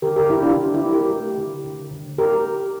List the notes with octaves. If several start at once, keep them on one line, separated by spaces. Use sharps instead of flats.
D3 G4 A#4
G4 A#4
D3 E4 G4
D4 F4
D3
E4 G4
C4
G4 A#4
A3
D3
D3
D3
A3 G4 A#4